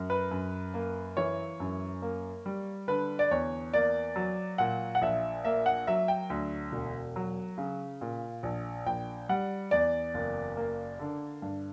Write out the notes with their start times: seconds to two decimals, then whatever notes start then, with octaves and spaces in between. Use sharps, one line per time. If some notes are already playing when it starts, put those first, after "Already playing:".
Already playing: F#2
0.10 B4
0.31 F#2
0.74 A#3
1.17 E3 C#5
1.60 F#2
2.02 A#3
2.46 G3
2.88 D3 B4
3.19 D5
3.31 E2 C#5
3.73 A#3 D5
4.16 F#3
4.58 A#2 F#5
4.95 F#5
5.01 A#1 E5
5.45 A#3 E5
5.66 F#5
5.87 F#3 E5
6.08 G5
6.30 D2
6.72 E1
7.16 F#3
7.58 C#3
8.01 A#2
8.43 A#1
8.86 A#1 G5
9.29 G3 F#5
9.71 E2 D5
10.14 F#1
10.57 A#3
10.99 D3
11.42 G2